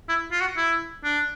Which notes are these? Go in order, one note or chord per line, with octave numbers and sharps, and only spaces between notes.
E4
F4
F#4
E4
D4